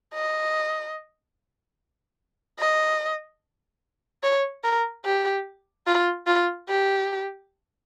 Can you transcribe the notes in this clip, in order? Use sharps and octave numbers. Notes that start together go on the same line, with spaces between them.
D#5
D#5
C#5
A#4
G4
F4
F4
G4